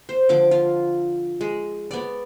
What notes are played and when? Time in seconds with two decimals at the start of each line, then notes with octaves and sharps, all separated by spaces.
0.09 C5
0.29 D3 F3 D6
0.51 F4
1.41 G#3
1.91 B3 D5